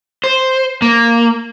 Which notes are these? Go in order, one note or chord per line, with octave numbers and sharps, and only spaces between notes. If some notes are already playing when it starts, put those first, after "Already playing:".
C5
A#3